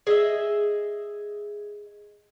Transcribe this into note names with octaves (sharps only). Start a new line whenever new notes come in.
G#4 D#5 E5